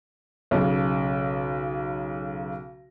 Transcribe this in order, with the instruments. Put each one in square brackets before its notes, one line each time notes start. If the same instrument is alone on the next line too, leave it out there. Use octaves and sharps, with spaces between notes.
[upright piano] B1 C#3